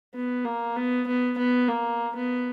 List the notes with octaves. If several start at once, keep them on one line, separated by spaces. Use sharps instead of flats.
B3
A#3
B3
B3
B3
A#3
B3